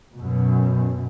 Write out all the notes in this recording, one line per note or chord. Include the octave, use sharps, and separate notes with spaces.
F#2 B2